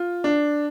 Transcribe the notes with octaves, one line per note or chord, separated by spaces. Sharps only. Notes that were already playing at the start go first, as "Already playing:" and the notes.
Already playing: F4
D4